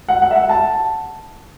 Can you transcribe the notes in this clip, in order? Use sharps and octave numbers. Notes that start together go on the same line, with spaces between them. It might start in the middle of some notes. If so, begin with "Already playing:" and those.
F#5
F#5
E5
F#5
A5